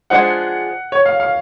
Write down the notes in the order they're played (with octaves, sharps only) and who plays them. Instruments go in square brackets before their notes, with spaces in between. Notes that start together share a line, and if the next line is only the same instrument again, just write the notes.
[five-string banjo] F3 G#3 D4 G#4 [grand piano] F#5
[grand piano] C#5
F5
F5